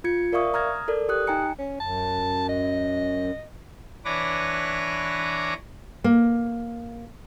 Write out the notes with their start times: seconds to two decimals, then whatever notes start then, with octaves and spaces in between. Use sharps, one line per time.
0.04 F4 G#6 C#7
0.33 A#4 D5 E5 F5 C#6 D#6
0.54 A#5 D#6 F6 G#6 A#6
0.88 A4 A#4 D5
1.09 G4 D#6 F#6
1.27 D#4 G5 G#5 A#5 C#7
1.58 C#4
1.80 F#2 A5
2.49 D#5
4.05 E3 D4 B4 C#5 D6 A#6
6.04 A#3